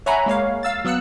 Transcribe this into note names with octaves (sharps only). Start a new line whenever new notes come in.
C#5 E5 F#5 G#5 A#5 B5
G#3 A#3 C#5 F5
F5 E6 A6
F#3 B3 E6 F#6 C#7